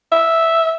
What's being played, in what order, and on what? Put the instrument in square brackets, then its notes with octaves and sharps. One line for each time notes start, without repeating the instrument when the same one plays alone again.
[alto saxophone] E5